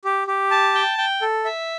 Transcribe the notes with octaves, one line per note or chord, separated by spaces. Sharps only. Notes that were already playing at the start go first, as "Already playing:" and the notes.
G4
G4
A5
G5
G5
A4
E5